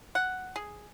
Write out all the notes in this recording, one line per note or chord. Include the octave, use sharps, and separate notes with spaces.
F#5
G#4